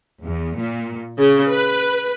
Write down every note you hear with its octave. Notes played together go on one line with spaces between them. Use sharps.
E2
A#2
C#3
B4